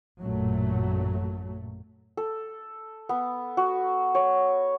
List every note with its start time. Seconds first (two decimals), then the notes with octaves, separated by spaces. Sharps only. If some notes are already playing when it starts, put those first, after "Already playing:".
0.20 A1 F#2 A#2 F#3 A3
2.17 A4
3.09 B3
3.57 F#4
4.15 C#5